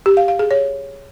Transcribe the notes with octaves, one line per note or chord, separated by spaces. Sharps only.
G4
F5
F5
G#4
C#5